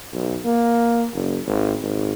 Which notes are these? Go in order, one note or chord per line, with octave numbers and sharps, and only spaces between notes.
B1
A#3
F#1
G#1
G#1